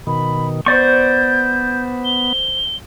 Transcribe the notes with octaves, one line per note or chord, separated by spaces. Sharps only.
B2 D#3 B5
B3 C5 D5 C#6 G6
G7